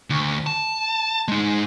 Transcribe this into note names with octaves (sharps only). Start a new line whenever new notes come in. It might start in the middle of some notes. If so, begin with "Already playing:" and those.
D2
A5
G#3 D#4